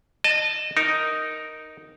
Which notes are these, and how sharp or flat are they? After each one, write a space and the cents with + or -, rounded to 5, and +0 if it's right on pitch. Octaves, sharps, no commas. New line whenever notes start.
D#5 -25 A5 +0
D#4 +0 A#4 +0